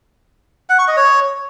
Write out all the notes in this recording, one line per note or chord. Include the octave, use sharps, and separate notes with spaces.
F#5
C#6
D#5
C#5